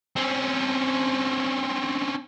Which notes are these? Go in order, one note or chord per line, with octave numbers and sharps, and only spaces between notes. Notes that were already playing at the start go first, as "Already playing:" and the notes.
C4 C#4